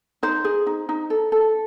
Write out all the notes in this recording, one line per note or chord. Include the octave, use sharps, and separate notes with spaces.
D#4 C5
G#4
D#4
D#4
A4
A4